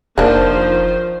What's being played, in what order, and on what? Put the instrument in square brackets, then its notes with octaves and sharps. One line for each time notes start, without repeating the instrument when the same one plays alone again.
[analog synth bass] F1 [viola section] D#3 F3 C5 [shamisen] A#3 D4